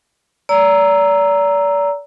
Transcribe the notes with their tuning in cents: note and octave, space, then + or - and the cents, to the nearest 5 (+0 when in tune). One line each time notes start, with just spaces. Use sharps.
D5 -35 A#5 +0 E6 +0